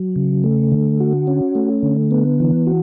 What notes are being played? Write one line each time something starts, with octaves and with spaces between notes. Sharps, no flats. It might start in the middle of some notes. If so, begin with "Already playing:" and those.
Already playing: F#3
C#3
A3
D3
F#4
C#4
A3
D3
B3
E3
F#4